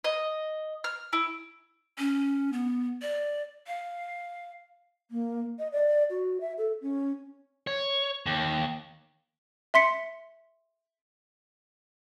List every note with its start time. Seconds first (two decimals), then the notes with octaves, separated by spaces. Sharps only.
0.04 D#5
0.84 F6
1.13 E4
1.98 C#4
2.53 B3
3.02 D5
3.67 F5
5.11 A#3
5.59 D#5
5.72 D5
6.10 F#4
6.41 E5
6.58 A4
6.82 C#4
7.67 C#5
8.26 D#2
9.74 E5 C6 B6 C#7